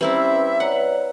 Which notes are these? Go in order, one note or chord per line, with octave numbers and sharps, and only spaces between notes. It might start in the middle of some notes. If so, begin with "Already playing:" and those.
G3 C4 C#4 E4 B4 E5 A#5 E6
C#5 D5 F#5 A#5